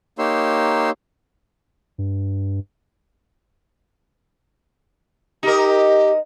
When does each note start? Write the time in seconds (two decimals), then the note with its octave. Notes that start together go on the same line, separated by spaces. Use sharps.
0.19 A#3 D#4 G4 C#5 C6 E6
1.98 G2
5.43 D#4 G4 A#4